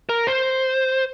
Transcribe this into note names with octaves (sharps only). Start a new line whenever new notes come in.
A#4
C5